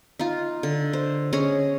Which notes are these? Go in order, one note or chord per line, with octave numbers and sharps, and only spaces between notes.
D#4 F4
D3
C5
C#4 G#4 C#5 D#5